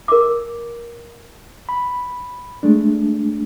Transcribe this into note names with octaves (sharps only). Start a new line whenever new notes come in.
A#4 D6
B5
G#3 A3 D4